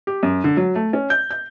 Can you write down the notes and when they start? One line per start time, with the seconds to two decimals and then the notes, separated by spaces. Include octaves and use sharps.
0.07 G4
0.23 F#2
0.44 D3
0.57 F#3
0.75 A3
0.93 C#4
1.10 G6
1.31 G6